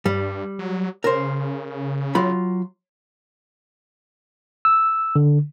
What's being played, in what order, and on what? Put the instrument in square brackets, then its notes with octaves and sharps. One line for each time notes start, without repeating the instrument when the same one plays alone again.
[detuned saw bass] G2 [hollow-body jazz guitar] G3
[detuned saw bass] F#3
[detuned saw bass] C#3 [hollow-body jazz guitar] A#4 C5
[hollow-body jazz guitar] F#3 F4 B5
[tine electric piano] E6
D3